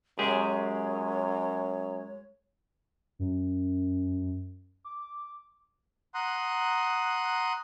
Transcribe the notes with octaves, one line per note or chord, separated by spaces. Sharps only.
F#2 G#3 G4 G#4 C#5
F#2
D6
F#5 A#5 C6 D#6 F#6